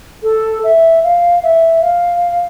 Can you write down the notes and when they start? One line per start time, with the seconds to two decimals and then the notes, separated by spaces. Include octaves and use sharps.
0.23 A4
0.64 E5
1.03 F5
1.43 E5
1.82 F5